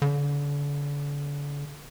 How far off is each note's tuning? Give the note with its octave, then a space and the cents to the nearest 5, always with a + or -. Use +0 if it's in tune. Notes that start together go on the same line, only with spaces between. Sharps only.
D3 -35